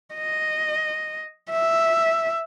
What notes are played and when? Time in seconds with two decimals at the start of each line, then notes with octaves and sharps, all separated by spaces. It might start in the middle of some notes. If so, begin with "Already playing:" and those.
0.15 D#5
1.51 E5